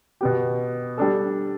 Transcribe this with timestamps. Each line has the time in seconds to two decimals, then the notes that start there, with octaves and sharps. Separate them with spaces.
0.21 B2 B3 G4
0.98 G3 D4 A4